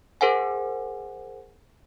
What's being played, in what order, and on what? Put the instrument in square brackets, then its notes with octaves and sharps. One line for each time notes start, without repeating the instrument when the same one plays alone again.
[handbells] G#4 A#4 C5 F#5 G#5